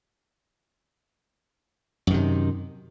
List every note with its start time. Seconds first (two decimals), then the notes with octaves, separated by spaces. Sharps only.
2.07 F#2
2.11 D#3
2.14 C3